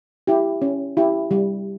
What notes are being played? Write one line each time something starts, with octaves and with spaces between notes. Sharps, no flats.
E4 G4
C#4
E4 G4
G3